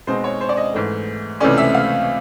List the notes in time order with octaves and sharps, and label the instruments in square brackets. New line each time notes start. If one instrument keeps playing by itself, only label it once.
[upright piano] B2 G#3 C4 D#4 C5
C#5
C5
D5
D#5
G#2 E3 A3
C#2 C3 E3 A3 C#4 D5
E5
F5